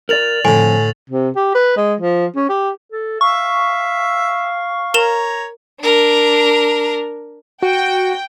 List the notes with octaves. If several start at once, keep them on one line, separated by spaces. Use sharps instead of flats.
A#4 D5 A6 F7 F#7
F2 A2 D3 G#5
C3
G4
B4
G#3
F3
C#4
G4
A4
E5 F5 C#6
A#4 C#5 A#5 E7 F7
D4 A#4
F#4 G5